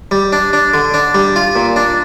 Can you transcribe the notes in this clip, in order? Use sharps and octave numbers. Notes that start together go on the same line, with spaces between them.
G3
D4
D4
D3
D4
G3
F4
A#2
D4